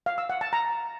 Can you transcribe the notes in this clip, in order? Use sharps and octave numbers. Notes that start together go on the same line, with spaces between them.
F5
E6
F#5
A5
A#5